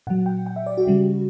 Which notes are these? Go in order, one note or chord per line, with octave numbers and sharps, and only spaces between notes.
A#2 F#3 F#5
G5
G5
E5
D5
F#4
C#3 G3